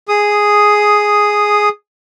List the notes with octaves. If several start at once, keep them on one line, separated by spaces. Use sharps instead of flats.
G#4 D#6